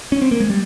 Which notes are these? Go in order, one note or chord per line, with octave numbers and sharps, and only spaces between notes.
C#4
C4
A#3
G#3
G3